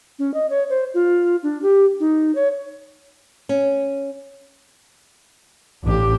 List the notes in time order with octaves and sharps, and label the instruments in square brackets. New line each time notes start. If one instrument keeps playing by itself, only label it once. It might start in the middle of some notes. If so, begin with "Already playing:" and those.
[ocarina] C#4
D#5
C#5
C5
F4
D4
G4
D#4
C#5
[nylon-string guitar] C#4
[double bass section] A1 [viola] D4 G4